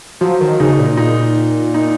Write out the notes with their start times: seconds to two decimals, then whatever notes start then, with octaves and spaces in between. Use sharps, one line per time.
0.21 F3 F#3
0.41 D#3
0.60 C#3 D#4
0.79 A#2
0.97 D#4
1.74 D#4